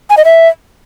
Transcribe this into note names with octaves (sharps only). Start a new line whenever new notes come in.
G#5
D#5
E5